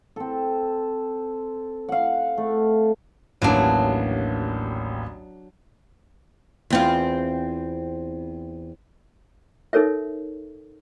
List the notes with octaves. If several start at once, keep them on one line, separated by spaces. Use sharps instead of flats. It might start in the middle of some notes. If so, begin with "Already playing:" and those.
C4 A4
F5 F#5
A3
A1 D#2 F#3 D4
E2 C4 F4
D#4 A4 A#4 C#5 E5